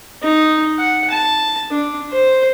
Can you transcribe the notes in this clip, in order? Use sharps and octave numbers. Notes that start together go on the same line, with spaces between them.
D#4
F#5
A5
D4
C5